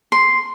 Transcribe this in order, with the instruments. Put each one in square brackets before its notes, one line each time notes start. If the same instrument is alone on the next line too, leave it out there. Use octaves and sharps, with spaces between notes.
[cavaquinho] C6